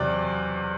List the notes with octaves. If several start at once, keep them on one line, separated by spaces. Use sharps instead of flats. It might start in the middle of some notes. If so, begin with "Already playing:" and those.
Already playing: E2 C3 F#3 D5